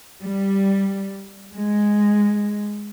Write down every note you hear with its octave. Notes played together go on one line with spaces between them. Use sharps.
G3
G#3